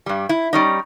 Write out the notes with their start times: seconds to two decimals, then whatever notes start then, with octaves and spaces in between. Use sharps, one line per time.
0.06 G2 G3
0.29 E4
0.53 G3 C#4 D#4